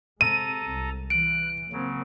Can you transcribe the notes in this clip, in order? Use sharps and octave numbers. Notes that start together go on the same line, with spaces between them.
C3 G#3 C4 A4 A#5 D#7
C2
E3 F#6 D7
C#3 F#3 A#3 C4